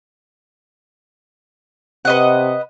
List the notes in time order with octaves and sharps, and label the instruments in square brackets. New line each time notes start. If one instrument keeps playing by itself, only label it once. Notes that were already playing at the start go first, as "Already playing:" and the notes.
[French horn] C3 [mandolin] B4 D#5 F#5